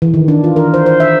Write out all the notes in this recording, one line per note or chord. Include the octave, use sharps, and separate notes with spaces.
E3
D#3
D4
F4
A#4
C5
C5
E5